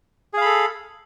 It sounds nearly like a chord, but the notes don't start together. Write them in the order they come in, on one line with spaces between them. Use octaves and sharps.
G#4 F5 B5 A4